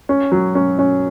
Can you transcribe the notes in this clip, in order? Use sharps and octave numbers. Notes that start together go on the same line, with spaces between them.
C#4
F#3
C#4
C#4